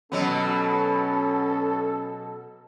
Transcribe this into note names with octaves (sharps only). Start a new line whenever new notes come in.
B2 F#3 B3 C#4 A4